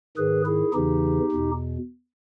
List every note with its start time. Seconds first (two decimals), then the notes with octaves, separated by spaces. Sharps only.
0.17 G#2 D#3 G#4 B4
0.46 E4 G#4
0.74 E2 C#3 E3 D#4 G4
1.32 E2 B2